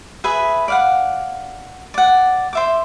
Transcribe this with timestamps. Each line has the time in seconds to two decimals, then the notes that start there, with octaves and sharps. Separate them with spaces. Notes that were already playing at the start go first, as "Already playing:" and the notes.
0.24 G#4 B4 E5
0.68 D5 F5 F#5
1.94 D5 F#5
2.53 C5 E5 D6